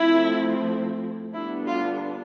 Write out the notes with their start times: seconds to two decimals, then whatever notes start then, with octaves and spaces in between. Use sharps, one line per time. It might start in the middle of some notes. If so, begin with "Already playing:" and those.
Already playing: F3 A3 C4 E4
1.33 D3 G3 B3 D4 E4
1.67 F4